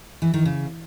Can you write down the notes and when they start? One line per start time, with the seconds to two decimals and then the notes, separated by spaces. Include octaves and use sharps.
0.22 E3
0.34 D#3
0.45 C#3